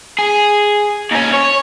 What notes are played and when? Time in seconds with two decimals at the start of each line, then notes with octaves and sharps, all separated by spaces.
0.19 G#4
1.11 D#2 C#4
1.33 C#5